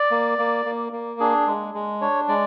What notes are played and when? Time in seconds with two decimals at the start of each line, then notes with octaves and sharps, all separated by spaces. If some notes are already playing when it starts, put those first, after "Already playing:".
Already playing: D5
0.11 A#3
0.38 A#3
0.65 A#3
0.92 A#3
1.20 D4 G#4
1.47 G#3
1.74 G#3
2.01 D4 C#5
2.28 G#3 D5